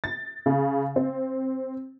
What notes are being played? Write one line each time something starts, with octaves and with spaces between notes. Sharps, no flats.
A6
C#3
C4